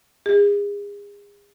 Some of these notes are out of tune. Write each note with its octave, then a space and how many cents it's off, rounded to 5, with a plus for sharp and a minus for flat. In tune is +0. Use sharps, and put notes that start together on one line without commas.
G#4 -35